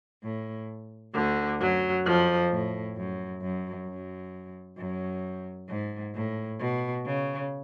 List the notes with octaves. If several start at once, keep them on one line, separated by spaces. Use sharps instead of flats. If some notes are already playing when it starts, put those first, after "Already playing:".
A2
D2 D3
F#2 F#3
F2 F3
A2
F#2
F#2
F#2
F#2
G#2
A2
B2
C#3